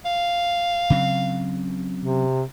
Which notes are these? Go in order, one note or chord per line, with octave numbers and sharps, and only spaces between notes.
F5
C#3 F#3 C4
C3